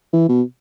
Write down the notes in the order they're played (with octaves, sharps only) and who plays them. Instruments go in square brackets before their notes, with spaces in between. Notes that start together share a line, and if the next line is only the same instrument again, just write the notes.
[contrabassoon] E3
B2